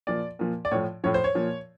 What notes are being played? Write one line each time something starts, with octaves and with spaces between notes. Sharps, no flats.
A#2 F3 D5
A#2 F3
D5
A2 F3 C#5
A2 F3 C#5
C5
C#5
A#2 F3